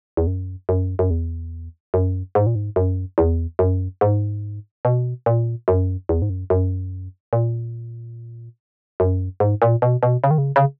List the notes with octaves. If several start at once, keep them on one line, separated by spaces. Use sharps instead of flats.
E2
F#2
F#2
F#2
E2
F#2
G#2
A#2
G#2
F#2
E2
F#2
G#2
B2
A#2
F#2
E2
G#2
F#2
F#2
A#2
F#2
G#2
A#2
B2
B2
C#3
D#3
C#3
C#3